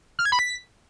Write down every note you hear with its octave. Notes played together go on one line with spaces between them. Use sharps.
F6
G#6
B5
B6